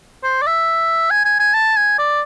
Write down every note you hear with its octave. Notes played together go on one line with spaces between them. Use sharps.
C5
D5
E5
G#5
G#5
G#5
A5
G#5
D5